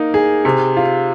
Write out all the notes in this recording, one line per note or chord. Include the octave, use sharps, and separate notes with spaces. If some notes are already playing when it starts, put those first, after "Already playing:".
Already playing: A#3 D#4
G#4
C3
F4